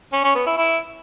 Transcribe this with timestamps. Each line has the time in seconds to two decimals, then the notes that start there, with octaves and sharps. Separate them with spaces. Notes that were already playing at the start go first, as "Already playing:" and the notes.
0.13 C#4
0.24 C#4
0.35 B3
0.46 E4
0.57 E4